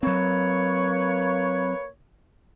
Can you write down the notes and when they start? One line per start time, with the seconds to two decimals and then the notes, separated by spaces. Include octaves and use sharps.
0.03 F#3 A#3 C4 B4 C#5